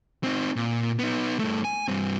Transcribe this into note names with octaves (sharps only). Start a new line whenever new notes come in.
C4 D#4
A#2
B3 D#4
G2 A3
G#5
G2 C4